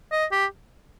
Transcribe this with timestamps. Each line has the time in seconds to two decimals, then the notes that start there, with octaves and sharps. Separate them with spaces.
0.11 D#5
0.32 G4